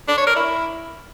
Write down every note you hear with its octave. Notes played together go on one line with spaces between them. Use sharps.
D4
C#5
A#4
E4